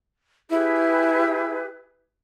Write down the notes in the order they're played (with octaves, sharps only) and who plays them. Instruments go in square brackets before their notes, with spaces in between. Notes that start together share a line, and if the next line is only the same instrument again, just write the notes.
[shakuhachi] E4 [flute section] G4 G#4 B4